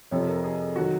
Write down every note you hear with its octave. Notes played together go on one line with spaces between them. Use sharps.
F2 C3 F3 C#5
A#4
G#4
D#3 F#3 F#4